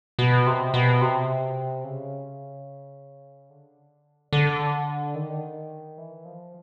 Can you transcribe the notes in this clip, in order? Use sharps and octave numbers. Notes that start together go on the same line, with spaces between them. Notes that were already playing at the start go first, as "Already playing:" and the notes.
B2
C3
B2
C3
C#3
D3
D3
D#3
E3
F3